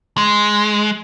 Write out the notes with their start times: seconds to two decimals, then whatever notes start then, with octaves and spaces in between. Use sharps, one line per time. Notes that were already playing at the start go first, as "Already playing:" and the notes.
0.18 G#3